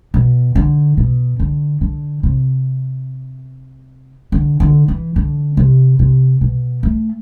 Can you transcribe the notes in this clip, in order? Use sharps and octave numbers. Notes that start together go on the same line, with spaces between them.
B2
D3
B2
D3
D3
C3
D3
D3
E3
D3
C3
C3
B2
A3